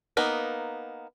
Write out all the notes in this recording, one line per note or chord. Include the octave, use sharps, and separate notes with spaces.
A#3 B3 D#4